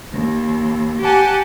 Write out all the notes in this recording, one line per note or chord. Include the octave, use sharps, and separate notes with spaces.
D#2
G4 F#5 G#5 A5